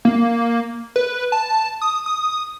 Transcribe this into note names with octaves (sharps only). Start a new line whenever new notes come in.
A#3
B4
A5
D#6
D#6